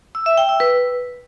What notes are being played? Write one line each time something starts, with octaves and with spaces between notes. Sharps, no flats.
E6
E5
G5
E6
B4